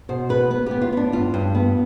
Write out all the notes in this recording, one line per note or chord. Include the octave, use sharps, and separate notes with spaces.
B2 C5
B3 B4
B3 B4
B3 G4
F4
B3 D4
G2 F4
G2
B3